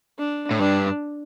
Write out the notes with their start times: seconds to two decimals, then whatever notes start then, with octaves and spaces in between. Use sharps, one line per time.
0.19 D4
0.51 A2
0.59 G2 D4